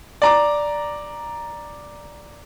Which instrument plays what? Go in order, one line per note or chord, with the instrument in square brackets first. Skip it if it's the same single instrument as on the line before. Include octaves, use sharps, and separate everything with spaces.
[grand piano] D5 A#5 D6